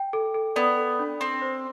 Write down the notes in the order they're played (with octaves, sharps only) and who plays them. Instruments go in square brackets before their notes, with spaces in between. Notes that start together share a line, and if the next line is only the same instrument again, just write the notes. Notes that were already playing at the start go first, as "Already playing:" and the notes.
Already playing: [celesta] G5
A4
A4
[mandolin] B3 [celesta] D5
[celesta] A4
D4
[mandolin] C4 [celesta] C6
[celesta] C5